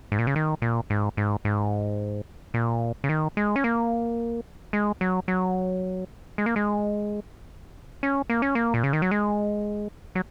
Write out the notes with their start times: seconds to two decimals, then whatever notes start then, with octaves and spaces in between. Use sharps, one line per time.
0.12 G#2
0.19 A#2
0.27 C#3
0.36 D#3
0.62 A#2
0.90 G#2
1.17 G#2
1.45 G#2
2.54 A#2
3.04 C#3
3.09 D#3
3.37 G#3
3.56 C#4
3.64 A#3
4.73 G#3
5.01 F#3
5.28 F#3
6.38 G#3
6.46 A#3
6.56 G#3
8.03 C#4
8.30 A#3
8.42 C#4
8.55 A#3
8.74 A#2
8.84 C#3
8.93 D#3
9.02 F#3
9.11 G#3
10.15 F#3